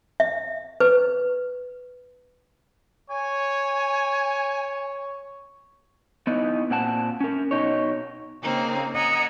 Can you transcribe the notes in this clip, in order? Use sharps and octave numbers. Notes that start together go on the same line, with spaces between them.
E5
B4
C#5 G#5
B3 D#4 E4 D#5
A#2 C4 F#5 A5
C#4 A#4
B2 D#4 C#5
C#3 A#3 C4 D#4
D#5 F#5 G#5 A#5 E6